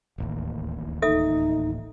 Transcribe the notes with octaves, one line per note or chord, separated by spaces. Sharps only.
D1 A1 D#2
D#4 A4 E5 D#6